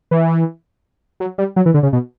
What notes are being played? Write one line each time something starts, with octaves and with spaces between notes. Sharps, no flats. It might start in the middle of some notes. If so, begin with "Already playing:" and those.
E3
F#3
G3
F#3
E3
D3
C#3
B2